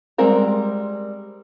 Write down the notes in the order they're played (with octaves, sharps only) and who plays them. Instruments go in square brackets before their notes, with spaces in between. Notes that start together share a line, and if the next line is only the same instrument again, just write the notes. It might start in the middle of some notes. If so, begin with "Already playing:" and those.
[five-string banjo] G3 G#3 C4 A#4 A#5